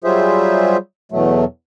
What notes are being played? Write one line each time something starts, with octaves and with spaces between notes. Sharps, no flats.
F#3 G3 F4 G#4 C5 E5
E2 B2 F#3 A3